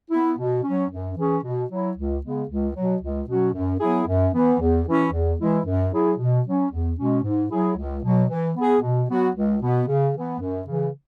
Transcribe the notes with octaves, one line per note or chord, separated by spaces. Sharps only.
B3 E4
B2
F#3 C#4
F#2
E3 C#4 G#4
B2
F#3 E4
C#2
C#3 G#3 B3
C#2
B2 F#3
C#2
B2 F#3 C#4 F#4
F#2
F#3 B3 E4 G#4
F#2
E3 B3
E2
E3 C#4 E4
E2
E3 G#3 E4
F#2
F#3 E4 G#4
B2
F#3 C#4
E2
B2 G#3 C#4
G#2
F#3 E4 G#4
C#2
B2 F#3
E3
B3 G#4
B2
F#3 B3 F#4
C#2
B2 B3
C#3
E3 B3
F#2
C#3 E3